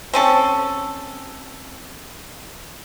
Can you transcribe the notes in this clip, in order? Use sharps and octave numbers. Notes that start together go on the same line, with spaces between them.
C4 C#4 A4